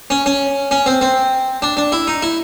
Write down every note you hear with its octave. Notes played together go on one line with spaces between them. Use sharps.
C#4
C#4
C#4
C4
C4
D4
D4
E4
D#4
E4